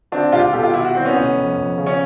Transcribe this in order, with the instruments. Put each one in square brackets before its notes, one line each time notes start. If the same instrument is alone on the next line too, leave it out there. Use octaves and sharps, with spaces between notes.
[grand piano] D3 C4 D4
C#2 F4 G4
B2 G4 A4
F4 G4
B2 E4 F#4
E4 F#4
G3 C4
B3 C#4
F1
F2
F2
C#3
C#4